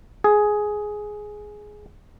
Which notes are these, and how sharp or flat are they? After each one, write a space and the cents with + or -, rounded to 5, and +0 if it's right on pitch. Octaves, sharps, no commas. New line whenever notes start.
G#4 +10